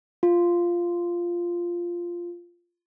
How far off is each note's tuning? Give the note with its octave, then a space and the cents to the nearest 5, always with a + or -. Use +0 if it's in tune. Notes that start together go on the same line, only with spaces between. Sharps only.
F4 -5